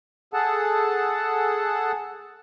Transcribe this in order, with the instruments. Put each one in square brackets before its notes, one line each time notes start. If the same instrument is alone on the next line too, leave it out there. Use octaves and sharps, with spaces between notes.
[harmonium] G#4 A4 F#5 A5